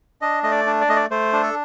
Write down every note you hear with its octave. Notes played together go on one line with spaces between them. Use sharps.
D4 D#5
A3 D#5
D5
D4
D5
A3 D#5
D5
A3 C5
D4
A4